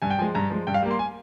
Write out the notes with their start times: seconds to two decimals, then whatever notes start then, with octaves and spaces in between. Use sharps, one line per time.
0.02 G2 G#5
0.10 G5
0.19 F3 G#5
0.22 G#3
0.35 G2 A#5
0.50 F3 G#3
0.67 G2 G5
0.74 F5
0.82 G3 A#3
0.91 C6
0.99 G#5